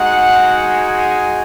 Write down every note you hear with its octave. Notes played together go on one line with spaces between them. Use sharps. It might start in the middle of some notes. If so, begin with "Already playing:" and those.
Already playing: G#3 D#4 F#4 F#5
G#5